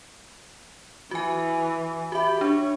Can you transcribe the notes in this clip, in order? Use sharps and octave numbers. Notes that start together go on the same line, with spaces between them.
E3 F#4 G#5
F#4 G4 E5 B5
D4 C#5